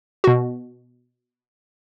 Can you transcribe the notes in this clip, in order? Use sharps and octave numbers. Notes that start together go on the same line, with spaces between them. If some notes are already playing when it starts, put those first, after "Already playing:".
B2 F#4